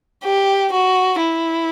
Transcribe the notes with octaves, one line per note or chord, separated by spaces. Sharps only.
G4
F#4
E4